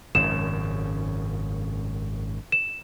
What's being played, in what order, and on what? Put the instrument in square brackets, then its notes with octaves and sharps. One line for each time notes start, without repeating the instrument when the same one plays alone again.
[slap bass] G#1 F#2 C#3 [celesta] E7
[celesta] E7